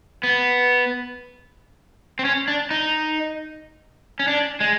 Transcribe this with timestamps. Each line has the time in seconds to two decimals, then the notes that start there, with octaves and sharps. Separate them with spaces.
0.23 B3
2.19 C4
2.25 C#4
2.48 D4
2.71 D#4
4.19 C#4
4.28 D4
4.60 G#3